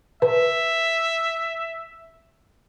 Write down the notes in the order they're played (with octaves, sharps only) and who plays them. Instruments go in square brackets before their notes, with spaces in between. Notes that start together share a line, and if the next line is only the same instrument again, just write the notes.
[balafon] B4 [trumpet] E5